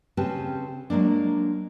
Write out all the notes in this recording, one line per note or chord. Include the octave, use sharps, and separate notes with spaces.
C#3 C4 C#4 G4 B4 A5
F#3 G#3 A#3 D4